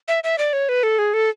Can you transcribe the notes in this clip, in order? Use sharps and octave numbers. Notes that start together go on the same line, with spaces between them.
E5
E5
D5
C#5
B4
A4
G#4
A4